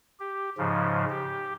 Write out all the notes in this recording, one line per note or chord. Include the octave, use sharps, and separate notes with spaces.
G4
G#2 C#3 F3
G4